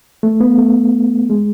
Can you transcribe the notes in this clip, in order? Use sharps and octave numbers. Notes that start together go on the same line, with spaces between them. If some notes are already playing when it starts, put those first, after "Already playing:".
A3
B3
A3
G#3